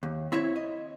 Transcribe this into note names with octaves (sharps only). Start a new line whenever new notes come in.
D#2
C4 E4 C#5 E5
D#5